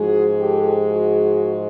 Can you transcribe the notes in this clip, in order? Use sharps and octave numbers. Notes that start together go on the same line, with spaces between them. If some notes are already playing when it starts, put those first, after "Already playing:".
Already playing: G#2 F3 G#3 F#4 G#4
G4 A4
F#4 G#4